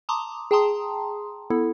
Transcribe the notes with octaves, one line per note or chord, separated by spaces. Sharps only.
A5 A#5 C6 D6 D#6
G#4 G5 A5 A#5 C6 D#6
B3 E4 A4